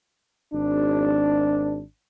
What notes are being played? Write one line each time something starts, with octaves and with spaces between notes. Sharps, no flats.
G#1 D4